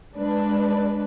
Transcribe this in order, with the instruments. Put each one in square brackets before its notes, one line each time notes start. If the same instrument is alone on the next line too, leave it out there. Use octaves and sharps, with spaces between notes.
[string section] G#3 D4 B4